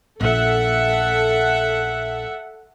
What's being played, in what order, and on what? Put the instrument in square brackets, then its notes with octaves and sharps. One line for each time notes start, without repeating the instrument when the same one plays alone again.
[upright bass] A#1 [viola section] A4 E5 F#5